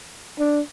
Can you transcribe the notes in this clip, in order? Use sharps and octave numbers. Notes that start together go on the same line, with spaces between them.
D4